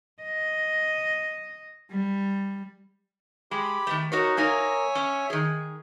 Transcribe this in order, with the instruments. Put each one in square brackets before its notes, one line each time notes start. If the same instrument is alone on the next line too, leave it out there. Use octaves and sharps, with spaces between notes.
[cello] D#5
G3
[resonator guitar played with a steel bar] G#3 [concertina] G4 B5
[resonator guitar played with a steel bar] D#3 A3
[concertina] D#4 [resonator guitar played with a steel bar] F#4 A#4 C#5
[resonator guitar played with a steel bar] A#3 D#4 A#4 [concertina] C#5 E5 G#5
[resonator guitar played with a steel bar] C#4
D#3 G#4